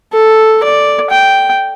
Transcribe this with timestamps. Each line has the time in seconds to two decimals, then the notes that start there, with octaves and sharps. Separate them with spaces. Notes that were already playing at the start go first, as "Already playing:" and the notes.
0.13 A4
0.64 D5
1.10 G5